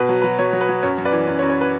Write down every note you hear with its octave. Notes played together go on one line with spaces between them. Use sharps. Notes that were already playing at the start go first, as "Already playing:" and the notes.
Already playing: B2 B4
F#3
F#3 B4
F#3 C#5
F#3
B4
F#3
F#2 C#5
F#2
B4 D5
E3
F#2
C#5
F#2
C#5
B4